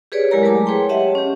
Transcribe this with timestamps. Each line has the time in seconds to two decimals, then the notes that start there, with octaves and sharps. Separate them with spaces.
0.12 G4 G#4 B4 C#5 D5
0.31 F#3 G#3 E4 G4 A#4 A#5
0.43 F#3 G#3 A3 G#5 A5 D6
0.66 G#4 B4 C#5 G5 C6
0.89 G4 C#5 D#5 E5 F#5 A5
1.15 C#4 G4